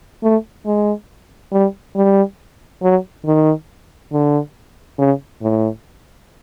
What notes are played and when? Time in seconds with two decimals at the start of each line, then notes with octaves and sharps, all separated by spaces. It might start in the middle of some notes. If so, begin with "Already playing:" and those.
0.23 A3
0.66 G#3
1.52 G3
1.96 G3
2.82 F#3
3.25 D#3
4.12 D3
4.98 C#3
5.42 A2